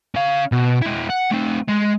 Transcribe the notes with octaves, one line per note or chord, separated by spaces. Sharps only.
C#4 F5
B2
G#3 E4
F#5
A3 C4
G#3